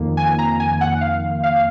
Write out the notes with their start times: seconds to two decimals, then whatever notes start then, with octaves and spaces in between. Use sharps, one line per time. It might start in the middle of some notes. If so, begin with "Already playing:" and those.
Already playing: F2 D#3 A#3
0.17 G#5
0.39 A#5
0.60 G#5
0.81 F#5
1.01 F5
1.43 F5